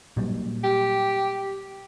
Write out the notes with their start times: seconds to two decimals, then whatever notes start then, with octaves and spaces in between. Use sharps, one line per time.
0.17 A#2 F#3 G3
0.64 G4